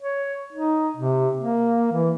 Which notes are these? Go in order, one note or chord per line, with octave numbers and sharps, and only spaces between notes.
C#5
D#4
C3
A#3
E3